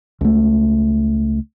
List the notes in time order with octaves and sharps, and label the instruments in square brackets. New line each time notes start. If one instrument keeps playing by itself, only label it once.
[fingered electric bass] C#2 A3